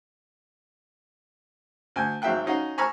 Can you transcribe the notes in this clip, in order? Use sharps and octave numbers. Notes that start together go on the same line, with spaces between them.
D2 G#5
G#1 F#3 E5 F5 G5 F#6
C#4 D#4 F#4 F5
G#5 A#5 B5 C#6 E6 F6